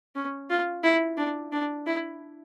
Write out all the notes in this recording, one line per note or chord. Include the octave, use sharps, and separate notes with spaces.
C#4
F4
E4
D4
D4
E4